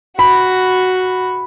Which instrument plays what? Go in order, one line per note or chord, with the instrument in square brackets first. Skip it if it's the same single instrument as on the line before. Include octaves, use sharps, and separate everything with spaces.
[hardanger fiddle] F#4 [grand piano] B5